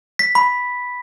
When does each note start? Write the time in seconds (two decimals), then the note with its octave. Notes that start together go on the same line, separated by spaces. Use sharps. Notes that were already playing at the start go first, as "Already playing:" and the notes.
0.19 B6
0.35 B5